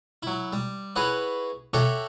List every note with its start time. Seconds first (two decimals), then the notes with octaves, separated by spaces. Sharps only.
0.23 F#3 E4
0.52 G3
0.96 E4 F#4 G#4 B4 C#5
1.74 F#4 G4 A4 C#5 E5 G5